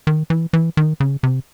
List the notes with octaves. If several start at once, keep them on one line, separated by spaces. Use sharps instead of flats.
D#3
E3
E3
D#3
C#3
C3